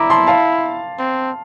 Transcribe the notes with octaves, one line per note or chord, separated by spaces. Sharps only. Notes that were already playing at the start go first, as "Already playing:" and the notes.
Already playing: E4 A#5 D6
A5 C6
F5 A5
C4